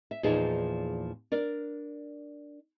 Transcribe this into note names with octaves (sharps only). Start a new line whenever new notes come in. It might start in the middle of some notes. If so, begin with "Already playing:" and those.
E5
E2 A#2 F3 D#4 G#4
D4 A#4 D5